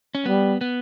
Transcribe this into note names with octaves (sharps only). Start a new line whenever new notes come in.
C#4
G3 B3
B3